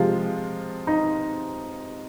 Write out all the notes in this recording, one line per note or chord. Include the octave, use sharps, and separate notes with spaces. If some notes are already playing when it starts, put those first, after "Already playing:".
Already playing: C3 F3 G#3 F4
D#4